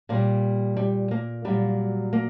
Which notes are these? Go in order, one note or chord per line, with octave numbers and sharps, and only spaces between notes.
A#2 G3 A#3
G3
A#3
A#2 F#3 G3
A#3